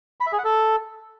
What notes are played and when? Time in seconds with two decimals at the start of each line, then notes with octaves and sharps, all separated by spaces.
0.20 B5
0.26 E5
0.32 G#4
0.38 F#5
0.44 A4